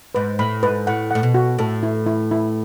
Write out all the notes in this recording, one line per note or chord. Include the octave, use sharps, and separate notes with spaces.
G#2 B4
A2 B5
G#2 B4
A2 F#5
A2 F#5
B2
F#4
A2 A4
E4
E4
E4